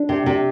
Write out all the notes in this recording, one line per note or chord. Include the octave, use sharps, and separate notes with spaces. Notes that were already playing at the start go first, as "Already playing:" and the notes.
Already playing: D4
C3
C3